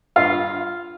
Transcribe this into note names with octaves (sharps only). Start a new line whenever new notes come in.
G2 F4 F5